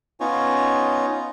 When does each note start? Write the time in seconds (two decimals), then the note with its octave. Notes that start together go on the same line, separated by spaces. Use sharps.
0.20 B3 C#4 D#4 F4 C#5